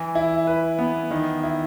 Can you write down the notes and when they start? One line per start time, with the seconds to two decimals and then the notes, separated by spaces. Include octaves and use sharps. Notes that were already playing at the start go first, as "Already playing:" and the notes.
Already playing: E3
0.15 E4
0.47 B4
0.79 B3
1.11 D#3
1.43 E4